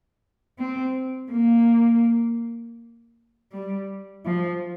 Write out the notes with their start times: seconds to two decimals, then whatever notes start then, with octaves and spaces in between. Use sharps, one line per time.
0.58 C4
1.31 A#3
3.52 G3
4.25 F3